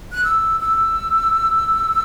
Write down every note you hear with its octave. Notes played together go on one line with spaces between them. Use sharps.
F#6
E6
E6